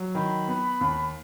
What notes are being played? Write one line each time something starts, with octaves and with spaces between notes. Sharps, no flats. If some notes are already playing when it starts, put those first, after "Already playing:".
Already playing: F#3
D#3 B5
B3
D#2